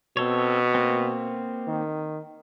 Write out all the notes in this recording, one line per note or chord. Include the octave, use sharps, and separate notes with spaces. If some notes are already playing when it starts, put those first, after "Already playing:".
B2 C4 A4 C#5
A#3 C4
D#3